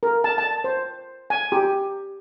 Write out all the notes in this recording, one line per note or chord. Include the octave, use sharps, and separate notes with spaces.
A#4
A5
A5
C5
G#5
G4